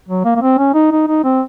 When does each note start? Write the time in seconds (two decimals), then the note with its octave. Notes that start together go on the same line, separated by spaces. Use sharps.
0.08 F#3
0.25 A#3
0.36 A#3
0.41 C4
0.58 C#4
0.74 D#4
0.92 D#4
1.07 D#4
1.24 C4